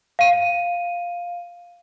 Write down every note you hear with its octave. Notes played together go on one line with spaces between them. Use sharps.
F5 D#7